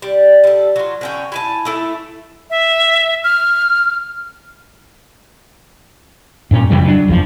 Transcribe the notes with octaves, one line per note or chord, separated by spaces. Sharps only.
G3
G3 A4
F#3 F4
D3 C#4 G5
E4 G#5 A5
A3 E4 A4
E5
F6
G2 A#2 C#4
F2 C#3 E3 G3
F#3 D4
F#1 E2 F3